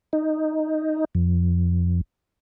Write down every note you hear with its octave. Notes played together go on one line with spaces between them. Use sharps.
D#4
F2